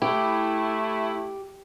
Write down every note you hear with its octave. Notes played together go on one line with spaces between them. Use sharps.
A3 E4 G4